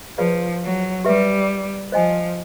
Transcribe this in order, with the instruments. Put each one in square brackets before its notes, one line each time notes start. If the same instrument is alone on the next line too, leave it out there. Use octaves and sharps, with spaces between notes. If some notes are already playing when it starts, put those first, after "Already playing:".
[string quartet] F3 [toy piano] F4 G#4 B4 D5 F5
[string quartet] F#3
[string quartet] G3 [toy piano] G4 B4 E5
[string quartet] F3 [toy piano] C5 D#5 G#5